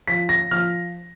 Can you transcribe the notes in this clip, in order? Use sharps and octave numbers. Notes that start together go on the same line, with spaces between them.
F3 B6
A#6
F3 F6